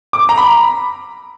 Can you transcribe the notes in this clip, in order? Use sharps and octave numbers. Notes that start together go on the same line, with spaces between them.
D6
A#5
B5